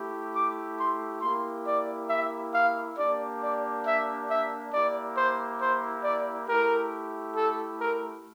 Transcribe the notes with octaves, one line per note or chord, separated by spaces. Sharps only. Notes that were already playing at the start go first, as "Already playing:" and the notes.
Already playing: A3 E4 G4
D6
C6
A#3 E4 G4 C6
D5
E5
F5
A#3 D4 G4 D5
D5
E5
E5
A#3 E4 G4 D5
C5
C5
D5
A3 E4 G4 A#4
A4
A#4